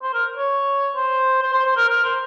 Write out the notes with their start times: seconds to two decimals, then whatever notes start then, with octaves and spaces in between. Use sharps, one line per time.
0.03 C5
0.14 A#4
0.37 C#5
0.96 C5
1.42 C5
1.53 C5
1.65 C5
1.77 A#4
1.88 A#4
2.04 C5